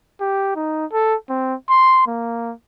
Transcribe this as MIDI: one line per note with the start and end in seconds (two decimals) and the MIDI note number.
0.21 0.53 67
0.56 0.85 63
0.92 1.15 69
1.30 1.55 60
1.70 2.06 84
2.07 2.53 58